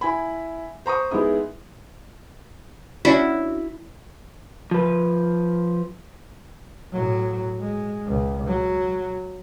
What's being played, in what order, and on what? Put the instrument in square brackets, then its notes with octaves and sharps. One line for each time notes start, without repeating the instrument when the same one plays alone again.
[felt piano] E4 G#5 B5
C5 A#5 C#6 D#6
G#3 B3 D#4 E4 D#6
[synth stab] C#4 D4 F#4 [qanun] E4
[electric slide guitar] F3 B4
[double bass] A2 F#3
G#3
C#2
F#3